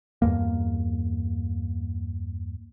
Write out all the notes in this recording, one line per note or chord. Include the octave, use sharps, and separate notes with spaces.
E2 G2 A#3